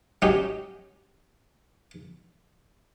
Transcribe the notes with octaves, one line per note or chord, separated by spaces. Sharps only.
F#3 C#4 D#4 G4